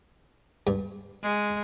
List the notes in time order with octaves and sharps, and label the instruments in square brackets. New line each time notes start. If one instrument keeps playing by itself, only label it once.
[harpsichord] G2
[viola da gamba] G#3